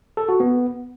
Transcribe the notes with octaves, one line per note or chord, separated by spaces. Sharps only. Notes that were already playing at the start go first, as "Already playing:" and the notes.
A4
F#4
B3